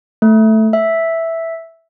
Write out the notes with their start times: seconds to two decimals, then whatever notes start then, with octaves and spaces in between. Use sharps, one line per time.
0.22 A3
0.73 E5